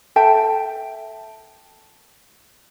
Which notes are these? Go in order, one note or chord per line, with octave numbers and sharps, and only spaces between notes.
A4 E5 G5 A5